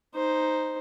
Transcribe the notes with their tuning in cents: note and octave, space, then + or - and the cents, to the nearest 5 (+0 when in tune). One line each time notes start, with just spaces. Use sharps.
D#4 +0 C5 +0